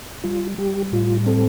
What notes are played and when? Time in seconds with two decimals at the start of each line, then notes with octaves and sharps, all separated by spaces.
0.24 G3 F4
0.58 G3 G4
0.93 A2 F4
1.26 C4 A4